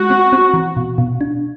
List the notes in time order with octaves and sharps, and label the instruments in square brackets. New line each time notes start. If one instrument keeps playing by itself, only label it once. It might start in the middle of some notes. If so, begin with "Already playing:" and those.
Already playing: [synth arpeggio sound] G#3 [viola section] F#4
[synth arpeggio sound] C4
C4
E3
B2
B2
D4